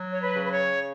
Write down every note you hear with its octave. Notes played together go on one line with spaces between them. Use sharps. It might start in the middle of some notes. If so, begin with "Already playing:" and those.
Already playing: F#3
C#5
B4
C#3
B4
C#5